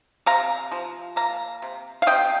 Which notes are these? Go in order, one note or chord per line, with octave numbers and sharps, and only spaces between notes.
C3 F5 A#5
F3
A#3 F5 A#5
C3
F5
C3 D#5 G5